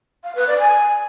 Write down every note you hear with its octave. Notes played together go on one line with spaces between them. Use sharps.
F5
B4
D5
G#5